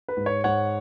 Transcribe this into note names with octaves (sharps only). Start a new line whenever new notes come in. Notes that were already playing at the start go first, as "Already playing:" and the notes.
B4
G#2
C#5
G#2 C#5 F#5